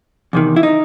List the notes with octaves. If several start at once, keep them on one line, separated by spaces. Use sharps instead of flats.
E2 C3 D#3
E4
D#4